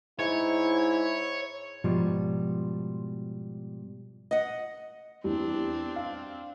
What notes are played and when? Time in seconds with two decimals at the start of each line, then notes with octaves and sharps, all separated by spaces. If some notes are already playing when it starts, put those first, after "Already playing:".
0.19 G#2 E4 C#5
1.84 G#2 B2 F3 G3
4.31 D#5 F#5
5.24 E2 G3 C4 D4
5.96 F5